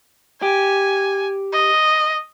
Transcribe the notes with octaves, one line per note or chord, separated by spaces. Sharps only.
G4 G#5
D#5